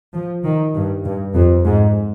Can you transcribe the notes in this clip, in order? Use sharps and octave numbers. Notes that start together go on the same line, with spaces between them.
F3
D#3
G2
G2
F2
G#2